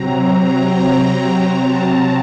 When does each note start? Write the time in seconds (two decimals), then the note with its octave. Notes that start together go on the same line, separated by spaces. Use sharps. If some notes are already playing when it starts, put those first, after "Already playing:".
Already playing: C3 F#3 C4 A#5
1.60 A5